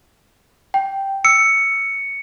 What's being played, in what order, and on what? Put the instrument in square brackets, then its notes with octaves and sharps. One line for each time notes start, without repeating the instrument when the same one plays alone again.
[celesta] G5
[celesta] E6 [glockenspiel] C#7